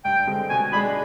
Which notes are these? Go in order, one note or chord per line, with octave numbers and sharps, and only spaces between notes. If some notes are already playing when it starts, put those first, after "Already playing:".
G2 G5
D3 G#3 C4 G4
B2 G#5
G#3 D4 G#4 B5